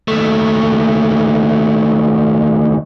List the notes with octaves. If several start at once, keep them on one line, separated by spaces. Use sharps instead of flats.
D#2 A3